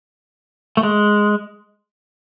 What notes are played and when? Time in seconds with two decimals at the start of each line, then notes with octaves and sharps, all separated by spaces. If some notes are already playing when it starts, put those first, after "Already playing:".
0.77 A3
0.83 G#3